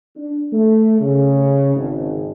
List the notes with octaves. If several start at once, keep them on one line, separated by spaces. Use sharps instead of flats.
D4
A3
C#3
G#1